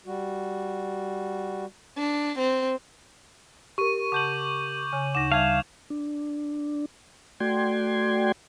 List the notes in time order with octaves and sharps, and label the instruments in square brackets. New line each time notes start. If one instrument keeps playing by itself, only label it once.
[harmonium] G3 F#4
[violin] D4
C4
[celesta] G4 A#4 [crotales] C#6 D#7
[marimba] C#3 F#5 A5 [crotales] D6 G6 F#7
[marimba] C#3 C#5 G#5
[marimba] D2 D#4 F#5 [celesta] D6 A#6 [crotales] E7
[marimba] G3 [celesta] E5 A5 [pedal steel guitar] F5 [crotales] G#6 F7
[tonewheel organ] D4
A3 F#4 D5 G5 C6 G#6